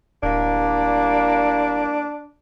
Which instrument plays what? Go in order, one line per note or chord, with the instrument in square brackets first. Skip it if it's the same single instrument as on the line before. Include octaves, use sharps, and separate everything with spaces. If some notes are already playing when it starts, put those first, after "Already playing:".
[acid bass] D1 [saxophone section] A2 G3 A#3 [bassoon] D4